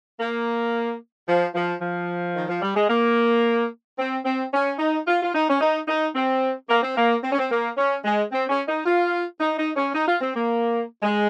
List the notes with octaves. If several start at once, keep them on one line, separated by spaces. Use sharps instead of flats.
A#3
F3
F3
F3
D#3
F3
G3
G#3
A#3
C4
C4
C#4
D#4
F4
F4
D#4
C#4
D#4
D#4
C4
A#3
C4
A#3
C4
C#4
C4
A#3
C#4
G#3
C4
C#4
D#4
F4
D#4
D#4
C#4
D#4
F4
C4
A#3
G#3